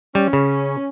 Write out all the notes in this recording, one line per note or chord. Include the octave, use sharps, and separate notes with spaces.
G3 C#4
C#3